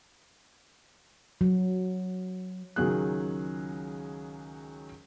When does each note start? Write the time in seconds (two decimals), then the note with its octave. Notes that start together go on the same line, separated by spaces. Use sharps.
1.41 F#3
2.76 C#2 D#3 F#3 G#4 F#6